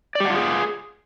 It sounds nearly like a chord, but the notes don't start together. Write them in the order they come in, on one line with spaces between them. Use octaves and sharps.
D5 G4 F#5 F4 G#4